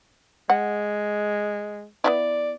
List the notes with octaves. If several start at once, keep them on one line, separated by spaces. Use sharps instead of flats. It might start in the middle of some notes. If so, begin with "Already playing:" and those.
G#3 F#5
B3 D#4 E4 D5